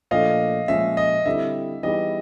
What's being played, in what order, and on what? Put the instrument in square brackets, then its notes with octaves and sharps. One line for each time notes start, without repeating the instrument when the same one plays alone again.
[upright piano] A#2 F3 A3 D4 [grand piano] D#5 F5
[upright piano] A#2 F3 G#3 C#4 [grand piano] E5
[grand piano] D#5
[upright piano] D3 G3 C4 E4 [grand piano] E5
[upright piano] E3 G3 B3 D#4 G#4 [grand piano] D#5